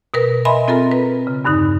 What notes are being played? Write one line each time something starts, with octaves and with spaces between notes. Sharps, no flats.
B2 A#4 B4
D#5 E5 G#5 B5 C6
C4 F4 A4 A#4 A#5
B4
C#3
E2 G2 D3 D#4